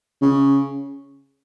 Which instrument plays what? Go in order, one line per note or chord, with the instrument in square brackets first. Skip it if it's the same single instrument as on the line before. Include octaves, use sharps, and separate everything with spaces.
[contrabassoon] C#3